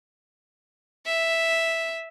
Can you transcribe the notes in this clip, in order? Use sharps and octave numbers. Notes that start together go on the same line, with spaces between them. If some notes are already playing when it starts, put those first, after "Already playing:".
E5